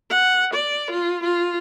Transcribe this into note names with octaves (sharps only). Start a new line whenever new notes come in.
F#5
D5
F4
F4